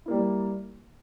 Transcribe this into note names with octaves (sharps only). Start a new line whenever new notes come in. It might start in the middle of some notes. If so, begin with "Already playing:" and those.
G3 A#3 E4